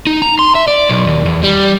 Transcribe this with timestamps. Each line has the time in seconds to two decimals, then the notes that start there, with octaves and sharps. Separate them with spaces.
0.07 D#4
0.22 A#5
0.39 C6
0.55 E5
0.68 D5
0.89 B1
1.07 D#2
1.26 E2
1.43 G3